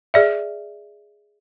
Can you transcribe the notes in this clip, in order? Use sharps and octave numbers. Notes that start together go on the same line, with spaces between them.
G#4 D5 E5